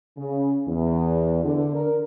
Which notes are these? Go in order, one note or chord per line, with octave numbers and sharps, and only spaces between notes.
C#3
E2
D3
A#4